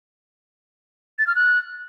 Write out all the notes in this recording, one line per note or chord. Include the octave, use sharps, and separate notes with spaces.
A6
F6
F#6